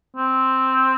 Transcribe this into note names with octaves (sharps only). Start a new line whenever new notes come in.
C4